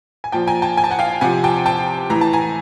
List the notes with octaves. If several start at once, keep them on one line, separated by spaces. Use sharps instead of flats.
G#5
A#2 F3 G5 A5
G#5 A#5
G5 A5
G#5
A5
F#5 G#5
F5 G5
C3 F3 F#5 G#5
G5 A5
G5 A5
A2 E3 A#5
A5
G#5 A#5